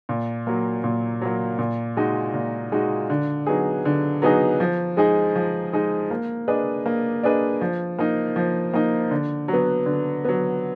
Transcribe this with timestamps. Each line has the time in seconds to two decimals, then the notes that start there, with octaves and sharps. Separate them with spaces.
0.09 A#2
0.47 F#3 A#3
0.84 A#2
1.21 F#3 A#3
1.58 A#2
1.97 G#3 D#4 F#4
2.34 A#2
2.72 G#3 D#4 F#4
3.10 D3
3.47 F#3 B3 D#4 G#4
3.85 D3
4.22 F#3 B3 D#4 G#4
4.60 F3
4.97 G#3 D#4 G#4
5.36 F3
5.73 G#3 D#4 G#4
6.11 A#3
6.48 D4 G#4 B4 D#5
6.86 A#3
7.24 D4 G#4 B4 D#5
7.61 F3
7.99 A#3 D#4
8.36 F3
8.74 A#3 D#4
9.11 D3
9.48 F#3
9.53 B3
9.86 D3
10.25 F#3 B3